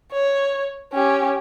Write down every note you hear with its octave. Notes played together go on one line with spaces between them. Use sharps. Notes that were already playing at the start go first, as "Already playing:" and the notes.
C#5
C#4 G4